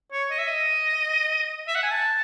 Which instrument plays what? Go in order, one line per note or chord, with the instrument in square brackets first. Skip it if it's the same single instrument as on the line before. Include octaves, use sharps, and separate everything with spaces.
[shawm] C#5
D#5
E5
D#5
E5
F#5
G#5
A5